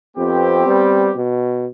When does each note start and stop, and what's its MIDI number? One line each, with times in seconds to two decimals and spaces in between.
0.17 0.65 41
0.17 1.17 59
0.17 1.17 60
0.17 1.17 67
0.67 1.10 55
1.16 1.67 47